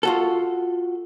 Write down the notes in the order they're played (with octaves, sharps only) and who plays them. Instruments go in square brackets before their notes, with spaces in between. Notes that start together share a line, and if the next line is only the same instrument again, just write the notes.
[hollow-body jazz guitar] F4 F#4 A4